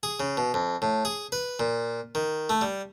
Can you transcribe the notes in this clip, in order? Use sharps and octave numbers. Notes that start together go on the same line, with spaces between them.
G#4
C#3
B2
F2
A2
G#4
B4
A#2
D#3
A3
G3